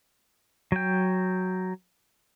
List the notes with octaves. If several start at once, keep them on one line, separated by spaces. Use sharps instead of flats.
F#3 G5